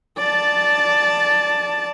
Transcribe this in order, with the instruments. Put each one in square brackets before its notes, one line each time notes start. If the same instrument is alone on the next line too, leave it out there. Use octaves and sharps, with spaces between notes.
[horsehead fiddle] D5 A5